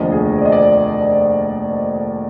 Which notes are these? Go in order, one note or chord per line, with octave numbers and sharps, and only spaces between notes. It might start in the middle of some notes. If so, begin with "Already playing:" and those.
Already playing: F1 D#2 D3 F3 D#5
G#4
D5
D#5
D5